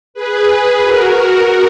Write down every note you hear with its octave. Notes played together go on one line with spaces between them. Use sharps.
G#4 B4
G#4 B4
F#4 A#4